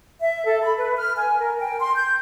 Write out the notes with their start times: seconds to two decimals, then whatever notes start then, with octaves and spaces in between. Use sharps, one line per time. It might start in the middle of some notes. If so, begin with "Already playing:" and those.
0.19 E5
0.44 A4
0.62 B5
0.77 B4
0.96 F6
1.16 G#5
1.40 A#4
1.59 G5
1.80 C6
1.94 G6